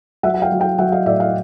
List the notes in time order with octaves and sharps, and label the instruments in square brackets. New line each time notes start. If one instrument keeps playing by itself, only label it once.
[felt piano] F#3 E5 F#5
F#5
F5 G5
F#3
F5 G5
F#3 E5 F#5
D#5 F5
A2 D5 E5
D#5 F5